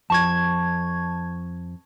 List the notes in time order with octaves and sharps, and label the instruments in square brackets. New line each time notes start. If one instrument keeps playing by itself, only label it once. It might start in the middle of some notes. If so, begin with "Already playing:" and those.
[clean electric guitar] F2 [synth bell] A5 C#6 G#6